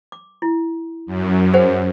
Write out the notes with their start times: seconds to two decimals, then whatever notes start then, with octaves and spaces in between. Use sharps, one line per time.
0.12 D6
0.42 E4
1.06 F#2
1.54 G#4 C5 F#5